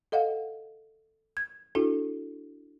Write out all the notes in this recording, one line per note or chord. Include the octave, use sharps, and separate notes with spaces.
A4 D#5 F5 F#5
G#6
D4 E4 F#4 A4